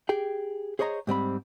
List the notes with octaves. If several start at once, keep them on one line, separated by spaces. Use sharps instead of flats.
G4 G#4 G5
G#4 C5 C#5 D#5 A#5
G#2 G3 C4 B5